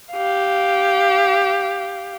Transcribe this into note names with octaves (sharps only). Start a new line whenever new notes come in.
G4 F5